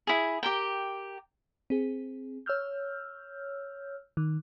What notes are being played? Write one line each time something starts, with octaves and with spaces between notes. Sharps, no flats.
E4 G#4
G4 A#4 G5
C4 G#4
C#5 E6 F6 G6
D#3